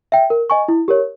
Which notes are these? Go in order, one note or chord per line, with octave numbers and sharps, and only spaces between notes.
E5 G5
A#4
D#5 G#5 C#6
E4
G4 A#4 C#5